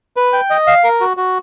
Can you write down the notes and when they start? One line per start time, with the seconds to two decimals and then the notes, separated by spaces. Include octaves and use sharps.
0.17 B4
0.33 G5
0.50 D#5
0.67 F5
0.84 A#4
1.01 F#4
1.17 F#4